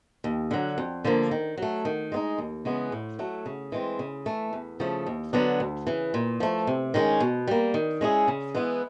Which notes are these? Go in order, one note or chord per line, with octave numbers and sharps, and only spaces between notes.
D#2
D3 F#3
F2
D3 F3 A#3
D#3
F#3 A3
D#3
G#3 B3 D#4
D#2
C#3 E3 G#3 B3
A2
F#3 A3
C#3
E3 G#3 C4
C#3
E3 A3
E2
C#3 F3 A3
D#2
D3 F#3 B3 D4
D2
C#3 E3
A#2
F3 A3
C3
D#3 G#3 C#4
B2
G3 A#3
D#3
G#3 C#4 E4 G#4
C#3
E3 G#3 B3 E4